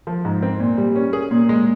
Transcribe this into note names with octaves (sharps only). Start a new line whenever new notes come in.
F3
G#2
C4
A#2
G3
C#4
G#4
A#2
G#3